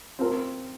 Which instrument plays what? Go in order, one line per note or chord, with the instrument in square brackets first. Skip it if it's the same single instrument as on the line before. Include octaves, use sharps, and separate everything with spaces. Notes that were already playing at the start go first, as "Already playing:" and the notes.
[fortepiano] C4 F4 A#4